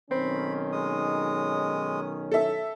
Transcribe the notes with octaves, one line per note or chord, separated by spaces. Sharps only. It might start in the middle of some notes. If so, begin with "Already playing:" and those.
B1 D#3 C4 C#4 B5
G#3 D#6
A4 E5